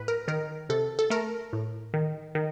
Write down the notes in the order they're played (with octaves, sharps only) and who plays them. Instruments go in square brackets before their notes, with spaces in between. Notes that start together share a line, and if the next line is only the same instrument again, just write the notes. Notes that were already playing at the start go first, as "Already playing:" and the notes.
Already playing: [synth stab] A2 B4
A#4
D#3 A#4
C3 A4
A4
A3 A#4
A2
D#3
D#3